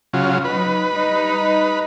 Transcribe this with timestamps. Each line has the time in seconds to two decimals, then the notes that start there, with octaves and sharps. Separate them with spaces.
0.13 C#3 F#3 F4
0.44 F#3 D#4 B4
0.93 G3 D#4